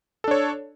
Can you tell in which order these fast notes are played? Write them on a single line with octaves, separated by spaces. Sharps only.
A4 D4 C#5